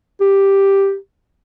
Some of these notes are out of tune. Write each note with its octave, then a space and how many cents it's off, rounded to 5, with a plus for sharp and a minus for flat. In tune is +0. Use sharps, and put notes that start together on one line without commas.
G4 +5